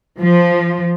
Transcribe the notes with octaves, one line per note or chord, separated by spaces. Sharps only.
F3